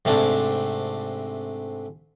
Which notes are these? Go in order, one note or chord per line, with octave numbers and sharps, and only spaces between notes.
G#2 C3 A3 D4